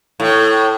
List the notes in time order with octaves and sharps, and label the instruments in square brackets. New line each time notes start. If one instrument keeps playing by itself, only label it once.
[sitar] A2